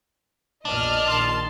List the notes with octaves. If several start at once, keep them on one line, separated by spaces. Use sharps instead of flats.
A#1 E2 D4 D#5 F6
A#1 D#3 A5 C6